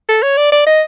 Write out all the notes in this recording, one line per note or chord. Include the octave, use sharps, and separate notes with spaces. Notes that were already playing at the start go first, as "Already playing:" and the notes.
A4
C#5
D5
D5
D#5